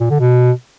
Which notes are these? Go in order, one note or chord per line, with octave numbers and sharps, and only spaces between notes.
A#2
D3
B2